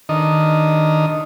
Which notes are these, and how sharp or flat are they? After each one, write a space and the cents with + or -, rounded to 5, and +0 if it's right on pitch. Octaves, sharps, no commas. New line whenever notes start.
D#3 +0 D4 +0 D#5 +0